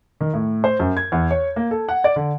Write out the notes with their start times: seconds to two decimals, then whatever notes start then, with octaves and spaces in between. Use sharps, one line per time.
0.21 D#3
0.34 A2
0.64 C5
0.80 F#2
0.97 G#6
1.12 E2
1.31 C#5
1.56 A#3
1.71 A4
1.89 F#5
2.04 D5
2.16 D3